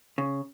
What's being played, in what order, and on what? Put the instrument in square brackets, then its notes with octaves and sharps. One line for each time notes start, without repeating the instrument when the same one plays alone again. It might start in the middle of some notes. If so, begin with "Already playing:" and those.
[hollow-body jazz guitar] C#3